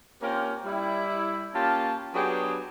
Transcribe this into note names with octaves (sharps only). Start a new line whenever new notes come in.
A#3 C4 C#4 F4 G4 A#4
G3 E4
A#3 C#4 F4 G4 A5
F#3 B3 D4 G4 G#4